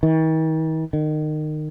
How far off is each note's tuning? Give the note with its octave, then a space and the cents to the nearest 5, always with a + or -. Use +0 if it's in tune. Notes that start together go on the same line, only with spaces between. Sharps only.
D#3 +45
D#3 -25